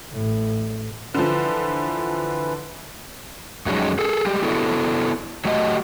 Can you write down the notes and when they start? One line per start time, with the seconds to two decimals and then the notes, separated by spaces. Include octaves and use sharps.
0.13 A1 A2
1.14 D3 E3 F3 B4
3.66 F2 F#3 G#3 C#4 D#4
3.99 G#4 A4
4.26 G3 G#3 G4
4.42 B3 D4 E4 F#4 A4
5.45 F#3 A3 F#4 G4 D5 D#5